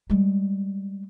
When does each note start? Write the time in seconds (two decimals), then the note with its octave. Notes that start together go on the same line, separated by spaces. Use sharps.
0.10 G3 G#3